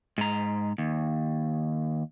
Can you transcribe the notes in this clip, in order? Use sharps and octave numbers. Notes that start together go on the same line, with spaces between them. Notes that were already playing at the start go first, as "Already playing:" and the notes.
G#2 A#5
D#2